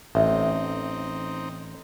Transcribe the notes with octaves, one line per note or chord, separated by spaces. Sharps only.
A1 C4 D#4 E5